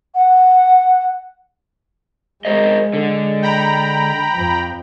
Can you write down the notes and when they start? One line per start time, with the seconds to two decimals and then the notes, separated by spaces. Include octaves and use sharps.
0.15 F#5
2.45 G#3 A#4 C5 D#5
2.93 D3
3.42 G5 A#5 B5
4.34 F2